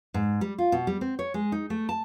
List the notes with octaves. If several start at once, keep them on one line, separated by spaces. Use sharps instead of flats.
G#2
G3
F4
B2
G3
C4
C#5
G#3
D#4
A3
A5